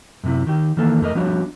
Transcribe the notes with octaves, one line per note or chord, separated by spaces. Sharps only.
F#2 C3 E4
D#3 G4
D#3 E3 A#3 A4
F2 A3 A#4 D#5
F3 G3 B3 D4 F#4 C#5